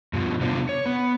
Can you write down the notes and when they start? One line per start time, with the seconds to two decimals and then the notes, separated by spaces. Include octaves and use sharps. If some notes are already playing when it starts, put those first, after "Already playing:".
0.13 G2 B2 F3
0.41 C3 G3 B3 D4 F4
0.69 C#5
0.86 B3